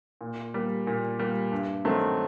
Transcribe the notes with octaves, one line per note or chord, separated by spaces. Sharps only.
A#2
G3 A#3
A#2
G3 A#3
G2
D#3 F#3 A3 C4